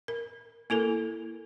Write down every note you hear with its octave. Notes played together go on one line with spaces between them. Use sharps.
A#4
A#3 E4 A4 A#4